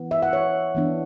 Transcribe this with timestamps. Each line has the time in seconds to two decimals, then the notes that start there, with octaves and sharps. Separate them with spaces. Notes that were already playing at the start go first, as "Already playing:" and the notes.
Already playing: E3 B3
0.11 E5
0.22 F#5
0.33 C#5
0.75 E3 B3 D4